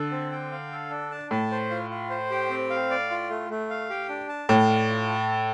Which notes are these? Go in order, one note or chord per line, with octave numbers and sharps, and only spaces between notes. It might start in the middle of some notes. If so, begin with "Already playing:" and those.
Already playing: D3 A4
C4
G5
F5
A4
D4
A5
A2 A5
C5
F4
F4
C5
G4
C4
F5
D5
F4
A3
A3
F5
G4
D4
A5
A2 F5
D5
F4
A5
A4